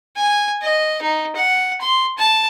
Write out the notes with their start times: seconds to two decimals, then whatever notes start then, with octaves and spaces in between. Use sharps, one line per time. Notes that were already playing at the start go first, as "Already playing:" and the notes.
0.16 G#5
0.62 D#5
1.02 D#4
1.36 F#5
1.81 C6
2.18 A5